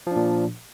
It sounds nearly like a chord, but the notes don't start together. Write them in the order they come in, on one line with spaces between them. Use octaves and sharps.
F3 D4 A#2